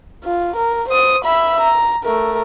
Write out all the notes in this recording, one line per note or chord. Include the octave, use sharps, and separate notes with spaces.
F4
A#4
C5 D#6
E5 B5
A#5
A3 A#4